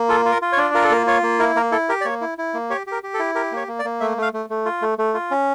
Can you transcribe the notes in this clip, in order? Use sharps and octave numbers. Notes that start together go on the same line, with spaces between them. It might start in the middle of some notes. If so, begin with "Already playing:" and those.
Already playing: A#3
F4 A4
F4
A#4
F4
C#5
D4
F4 A#4
A4
A#3 A#4
F4 C#5
A#3
E4 A#4
A#3 A#4
E4 A4
G4 A#4
D5
A#3 C#5
E4
E4
A#3
G4 C#5
G4 A#4
G4
A4
E4
G4 A#4
A#3 C#5
A#3
D5
A#3
A3 E5
A3 F5
A3
A3
F4
A3
A3
F4
C#4